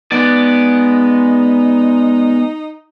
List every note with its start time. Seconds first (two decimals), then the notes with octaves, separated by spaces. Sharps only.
0.12 G#3 B3 D#4 D5